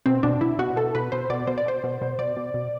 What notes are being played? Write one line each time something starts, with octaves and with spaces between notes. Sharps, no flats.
B2 C4
B2 D4
B2 E4
B2 F#4
B2 A4
B2 B4
B2 C5
B2 D5
B2 C5
D5
B2 C5
B2
B2
B2 D5
B2
B2